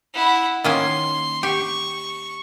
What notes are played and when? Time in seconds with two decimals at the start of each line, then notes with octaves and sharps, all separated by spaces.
0.14 E4 F#5
0.64 D#3 A#3 C#4 C6
1.43 G4 C#6